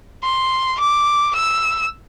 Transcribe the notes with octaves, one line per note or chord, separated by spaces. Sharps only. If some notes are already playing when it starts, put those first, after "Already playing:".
C6
D6
E6